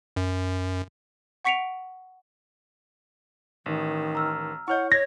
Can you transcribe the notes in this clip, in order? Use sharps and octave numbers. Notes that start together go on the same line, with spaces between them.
F#2
F#5 C#6 B6 C#7 D7 F7
A1 D#3
A#5 E6 F6
E4 C#5 D#5 F#5 C#6 F6 G6
C#5 G#6 A#6